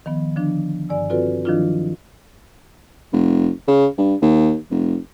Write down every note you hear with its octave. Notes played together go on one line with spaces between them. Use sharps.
D#3 F3 B3
D3 F3 D4
G2 D5 G#5 E6
C4 F4 F#4 A4 B4 D5
D#3 F3 F#3 D4 E4 F4
F1
C#3
G2
D#2
F1